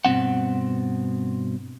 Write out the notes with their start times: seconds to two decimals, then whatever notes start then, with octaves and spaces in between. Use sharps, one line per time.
0.05 G2 B2 A#3 C4 F#5